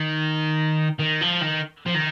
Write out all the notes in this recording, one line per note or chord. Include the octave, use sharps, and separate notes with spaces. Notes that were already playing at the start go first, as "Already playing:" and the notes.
Already playing: D#3
D#3
F3
D#3
F3
D#3